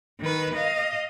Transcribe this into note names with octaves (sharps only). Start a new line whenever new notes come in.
D#3 B4
D#5 F5